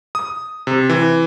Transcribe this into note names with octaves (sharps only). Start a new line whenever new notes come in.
D#6
C3
E3